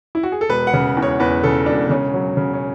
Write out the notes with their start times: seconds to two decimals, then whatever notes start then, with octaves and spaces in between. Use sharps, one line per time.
0.15 E4
0.23 F#4
0.32 G#4
0.41 A4
0.49 E1 B4
0.67 F#5
0.73 C#3
0.97 E2
1.02 C#5
1.20 E2 B4
1.43 C#3 A4
1.66 E1 D4
1.90 C#3 C#4
2.14 F#3
2.37 C#3
2.54 C#4